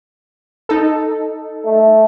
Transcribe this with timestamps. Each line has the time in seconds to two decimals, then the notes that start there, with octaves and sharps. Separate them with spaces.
0.69 D#4 A4
1.65 A3